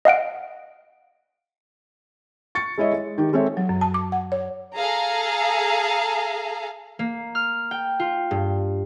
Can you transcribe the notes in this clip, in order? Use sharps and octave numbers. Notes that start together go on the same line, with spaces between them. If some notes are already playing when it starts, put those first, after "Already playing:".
D#5 F5 F#5 D7
C#6 A6 C#7
G#3 E4 C#5 D#5 E5
G#3
D#3 G4
G#3 C4 A4 C#5 E5
F#3
F#2
A5
D6
F#5
C#5
G#4 A4 F5 A#5
A#3
F6
G5
F4
G2